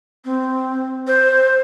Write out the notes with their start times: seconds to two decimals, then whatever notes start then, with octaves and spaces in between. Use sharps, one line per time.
0.25 C4
1.07 C5